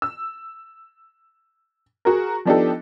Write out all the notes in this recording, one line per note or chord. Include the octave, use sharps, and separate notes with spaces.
E6
F#4 G#4 A#4
F3 B3 D4 D#4 G4 A4